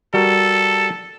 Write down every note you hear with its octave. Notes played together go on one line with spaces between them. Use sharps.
G3 F#4 A4 A#4